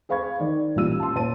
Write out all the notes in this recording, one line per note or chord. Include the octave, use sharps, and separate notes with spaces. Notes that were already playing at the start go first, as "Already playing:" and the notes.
G#4 C5 F5 B5 C#6 G#6
D#3 D5
A1 A#2 G3 F4 E6 D#7
A5 C6
A#2 C#5 A5 D#7